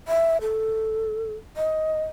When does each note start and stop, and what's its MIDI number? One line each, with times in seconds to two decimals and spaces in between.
0.08 0.37 76
0.41 1.34 69
1.57 2.03 75